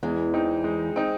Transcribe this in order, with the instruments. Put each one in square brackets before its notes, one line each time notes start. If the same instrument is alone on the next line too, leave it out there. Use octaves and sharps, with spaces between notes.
[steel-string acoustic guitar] E2 E3 [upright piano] G#3
[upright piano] C4 D#4
G#3
C4 D#4